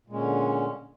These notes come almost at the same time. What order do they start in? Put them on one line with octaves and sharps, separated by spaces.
A#2 G#3 C#4 D3